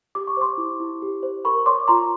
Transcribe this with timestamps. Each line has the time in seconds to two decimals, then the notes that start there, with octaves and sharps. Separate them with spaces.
0.15 G4 D6
0.27 C#6
0.37 C5 C6 D6
0.58 E4
0.80 E4
1.02 G4
1.23 C5
1.45 A#4 B5 C#6
1.66 C#5 C6 D6
1.88 F4 A#5 C6